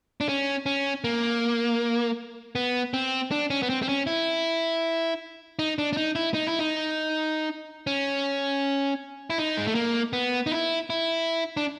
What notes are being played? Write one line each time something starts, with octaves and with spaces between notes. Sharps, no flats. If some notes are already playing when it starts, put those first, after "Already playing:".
D4
C#4
C#4
A#3
B3
C4
D4
C#4
B3
C4
C4
C#4
E4
D#4
D4
D4
D#4
E4
D#4
E4
D#4
C#4
E4
D#4
G#3
A3
A#3
B3
D#4
E4
E4
D4